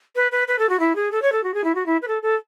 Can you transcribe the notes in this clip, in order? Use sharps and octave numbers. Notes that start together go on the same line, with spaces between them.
B4
B4
B4
A4
F#4
E4
G#4
A4
C#5
A4
F#4
G#4
E4
F#4
E4
B4
A4
A4